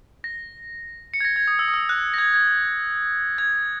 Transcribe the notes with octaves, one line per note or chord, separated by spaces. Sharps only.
A#6
C#7
G#6
A#6
G#6
D#6
E6
D#6
E6
F#6
A#6
G#6
G#6
G#6